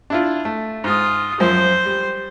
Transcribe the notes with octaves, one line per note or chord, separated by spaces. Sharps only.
D4 E4 F4
A3
G#2 F4 D#6
F#2 F3 C5
G3